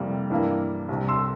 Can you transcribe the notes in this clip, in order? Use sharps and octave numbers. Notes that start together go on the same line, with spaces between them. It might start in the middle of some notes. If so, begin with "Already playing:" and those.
Already playing: F2 C3 G3 A#3 E4
G2 E3 G3 A#3
C2 C3 G3
C6 E6